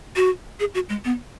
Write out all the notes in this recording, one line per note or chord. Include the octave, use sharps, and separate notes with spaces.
F#4
G#4
F#4
G#3
B3